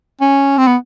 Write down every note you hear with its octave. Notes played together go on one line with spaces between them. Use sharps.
C#4
C4
B3